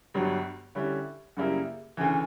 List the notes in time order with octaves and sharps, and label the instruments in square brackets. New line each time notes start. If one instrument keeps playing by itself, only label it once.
[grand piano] G1 G2 F#3
D3 G3 C#4 E4
F#2 C#3 G3 A#3 E4
D2 C#3 E3